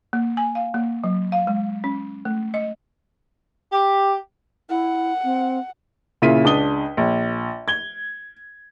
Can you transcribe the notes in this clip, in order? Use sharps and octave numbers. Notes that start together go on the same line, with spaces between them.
A#3
G#5
F5
A#3
F#3
F5
G#3
C#4
A3
D#5
G4
E4 F#5
C4
A#2 C#3 E4 B6 D#7
C#2 D4 D#6 G7
A#1
G#6 G7